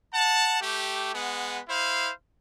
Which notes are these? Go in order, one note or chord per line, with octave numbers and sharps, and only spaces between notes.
F#5 A5
A3 G4
G#3 B3 F#5
E4 C5 F5